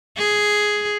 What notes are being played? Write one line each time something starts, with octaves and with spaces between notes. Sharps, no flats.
G#4